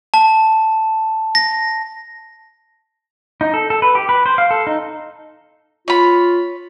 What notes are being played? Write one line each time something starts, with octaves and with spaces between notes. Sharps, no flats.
A5
A#6
D#4
A4
A4
B4
G4
B4
C5
F5
A4
D#4
F4 C#5 B5